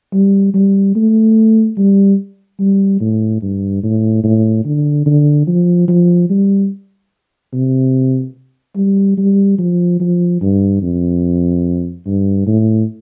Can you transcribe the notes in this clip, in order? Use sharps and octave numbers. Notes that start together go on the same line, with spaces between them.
G3
G3
A3
G3
G3
A2
G2
A2
A2
D3
D3
F3
F3
G3
C3
G3
G3
F3
F3
G2
F2
G2
A2